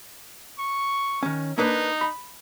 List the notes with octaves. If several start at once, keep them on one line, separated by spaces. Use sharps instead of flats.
C#6
D#3 C#4
A#3 D4 D#4 B4
B5